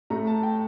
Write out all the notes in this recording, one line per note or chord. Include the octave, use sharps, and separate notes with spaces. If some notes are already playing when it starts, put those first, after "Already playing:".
A2 A3 A#5
A5
G5